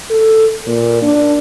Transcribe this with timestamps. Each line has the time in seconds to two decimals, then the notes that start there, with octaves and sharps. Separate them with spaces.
0.10 A4
0.67 A#2
1.03 D4